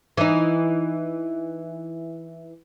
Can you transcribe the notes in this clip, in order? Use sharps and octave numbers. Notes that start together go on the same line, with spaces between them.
E3 D#4